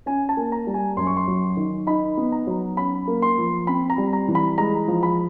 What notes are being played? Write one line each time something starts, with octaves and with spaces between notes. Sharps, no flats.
C#4 G#5
A5
A#3
A#5
G3
G#5
F#2 C6
C#6
C6
F#3
D#3
D#4 B5
B3
A#5
F#3
C#4 B5
A#3
C6
F3
C4 B5
A#5
G3
A#5
E3
B5
G#3 A#5
F3
B5